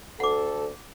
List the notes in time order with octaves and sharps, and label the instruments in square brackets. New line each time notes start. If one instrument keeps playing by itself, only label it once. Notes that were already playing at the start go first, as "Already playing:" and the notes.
[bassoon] D2 [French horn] A4 [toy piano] F#5 D6